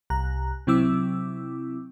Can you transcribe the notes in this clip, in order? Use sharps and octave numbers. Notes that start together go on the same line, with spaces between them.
C2 A#5 F#6
C3 F#3 C4 E4 D6 E6